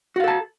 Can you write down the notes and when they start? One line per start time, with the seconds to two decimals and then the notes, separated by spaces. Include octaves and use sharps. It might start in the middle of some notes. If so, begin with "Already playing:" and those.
0.16 F#4
0.20 F5
0.24 A4
0.28 A5